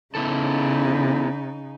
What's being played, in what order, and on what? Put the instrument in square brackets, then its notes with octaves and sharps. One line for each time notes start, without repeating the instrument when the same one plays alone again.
[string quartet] C#3 D#4 [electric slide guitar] B3 E4 A4